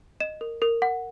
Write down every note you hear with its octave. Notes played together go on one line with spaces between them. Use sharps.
D#5 E7
A#4
A#4
F#5